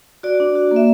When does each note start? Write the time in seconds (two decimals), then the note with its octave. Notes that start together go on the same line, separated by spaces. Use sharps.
0.23 F#4 D5
0.40 D4
0.55 F#4
0.71 A#3
0.76 E5